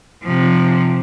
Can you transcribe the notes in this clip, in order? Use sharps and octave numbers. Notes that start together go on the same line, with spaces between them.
C3 F3